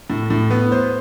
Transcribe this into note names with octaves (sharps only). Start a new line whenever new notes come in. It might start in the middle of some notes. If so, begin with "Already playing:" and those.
A2
A2
B3
C5